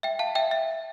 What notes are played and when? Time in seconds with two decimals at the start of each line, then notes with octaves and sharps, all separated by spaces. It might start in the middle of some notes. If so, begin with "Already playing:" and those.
0.03 E5 G5
0.19 F5 A5
0.35 E5 G5
0.51 E5